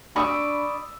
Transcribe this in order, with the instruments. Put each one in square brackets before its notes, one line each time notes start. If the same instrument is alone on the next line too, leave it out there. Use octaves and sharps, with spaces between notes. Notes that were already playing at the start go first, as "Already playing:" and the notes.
[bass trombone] D4 [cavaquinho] D5 C#6 [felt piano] B5 D#6 E6